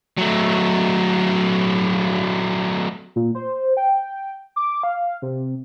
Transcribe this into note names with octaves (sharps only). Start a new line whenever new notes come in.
F#3 A3
A#2
C5
G5
D6
F5
C3